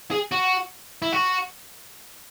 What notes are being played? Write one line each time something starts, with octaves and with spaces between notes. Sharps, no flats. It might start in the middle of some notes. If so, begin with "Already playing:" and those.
G#4
F#4
E4
F#4